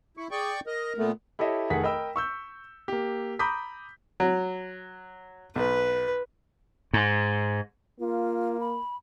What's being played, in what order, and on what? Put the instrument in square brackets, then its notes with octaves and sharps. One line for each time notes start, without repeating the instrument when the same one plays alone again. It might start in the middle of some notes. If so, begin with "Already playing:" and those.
[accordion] E4 [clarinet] C#6
[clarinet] G#4 [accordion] D5 G5 C#6
[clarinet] A#4 [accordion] D#5
[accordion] A#2 B3 [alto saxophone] A3
[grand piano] E4 G4 A4 C#5 D#5 E5
F1 D#3 G#4 A4 F#5 B6
A#4 D#5 G5 B5 E6
C#6 E6 G6
A#3 G4
A#5 B5 D6 D#6 G6 B6
[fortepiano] F#3
[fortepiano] B1 [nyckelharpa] B4
[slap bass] G#2
[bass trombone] A#3 [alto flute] F4
[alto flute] B5